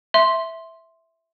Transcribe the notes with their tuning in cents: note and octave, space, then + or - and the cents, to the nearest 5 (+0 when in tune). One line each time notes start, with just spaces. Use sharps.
E5 +0 C6 +5